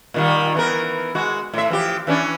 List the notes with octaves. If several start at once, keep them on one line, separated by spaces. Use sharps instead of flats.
A#2 D#3 G3
E3 B3 A#4
G#3 F#4
A2 E5
E3 F3 G4
E3 C#4 D4